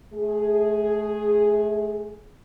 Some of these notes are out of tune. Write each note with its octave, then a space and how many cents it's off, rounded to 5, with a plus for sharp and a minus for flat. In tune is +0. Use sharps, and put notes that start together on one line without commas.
A3 -30 G#4 +0